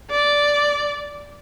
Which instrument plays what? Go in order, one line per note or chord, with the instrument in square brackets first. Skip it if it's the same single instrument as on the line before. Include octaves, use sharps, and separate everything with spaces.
[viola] D5